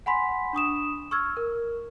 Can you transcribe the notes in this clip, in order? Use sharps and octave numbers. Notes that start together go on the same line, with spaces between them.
F#5 G#5 B5 C6 B6
D4 C#6 D#6 E7
C#6 E6 F6 G#6
A#4